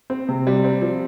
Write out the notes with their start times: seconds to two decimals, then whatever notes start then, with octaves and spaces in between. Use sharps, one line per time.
0.10 C4
0.29 C3
0.47 G3
0.64 C4
0.82 F3